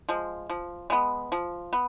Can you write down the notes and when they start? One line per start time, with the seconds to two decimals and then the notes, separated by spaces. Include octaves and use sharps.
0.09 F3 G#3
0.50 F3
0.90 G#3 B3
1.32 F3
1.73 B3